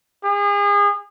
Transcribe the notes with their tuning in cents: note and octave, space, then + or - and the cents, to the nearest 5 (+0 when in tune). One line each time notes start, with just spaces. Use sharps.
G#4 -35